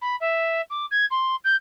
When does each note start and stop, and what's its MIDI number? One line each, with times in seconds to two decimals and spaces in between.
0.01 0.16 83
0.20 0.61 76
0.70 0.85 86
0.91 1.05 92
1.10 1.35 84
1.44 1.56 91